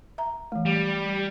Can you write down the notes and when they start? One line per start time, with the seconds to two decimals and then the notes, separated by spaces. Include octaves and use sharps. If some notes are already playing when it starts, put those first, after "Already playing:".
0.18 E5 A#5
0.52 E3 A3
0.66 G3